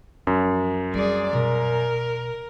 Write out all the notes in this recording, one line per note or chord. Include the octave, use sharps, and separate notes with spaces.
F#2 F3 C4
G3 C4 G#4 D5
B2 A#4